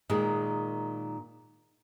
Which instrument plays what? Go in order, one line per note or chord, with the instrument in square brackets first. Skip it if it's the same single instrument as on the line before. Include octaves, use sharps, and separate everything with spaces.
[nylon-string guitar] A#2 D#3 G#3